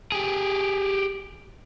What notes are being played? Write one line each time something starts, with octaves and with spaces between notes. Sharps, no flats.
G4 G#4